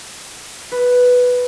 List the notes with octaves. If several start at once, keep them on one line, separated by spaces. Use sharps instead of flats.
B4